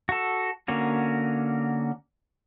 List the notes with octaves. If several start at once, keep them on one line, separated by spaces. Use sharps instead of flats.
F#4 A4
D3 A#3 C#4 F#4